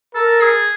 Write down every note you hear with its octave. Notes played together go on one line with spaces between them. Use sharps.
A4 A#4
G#4